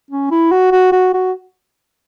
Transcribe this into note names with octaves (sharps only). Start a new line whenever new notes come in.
C#4
E4
F#4
F#4
F#4
F#4